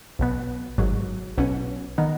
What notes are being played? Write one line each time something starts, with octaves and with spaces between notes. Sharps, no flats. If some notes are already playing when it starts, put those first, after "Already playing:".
B1 B2 B3
G#1 G#2 F#3
B1 B2 F#3 C#4
D#3 B3 D#4